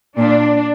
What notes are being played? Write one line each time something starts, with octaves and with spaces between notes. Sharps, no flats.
A#2 D4